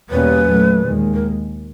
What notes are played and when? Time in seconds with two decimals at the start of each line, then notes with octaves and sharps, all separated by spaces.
0.10 E2 B2 G3 A#3 C#4 B4
0.48 A#2 F#3 A3
0.86 D#2 D#3 G#3
1.14 A#4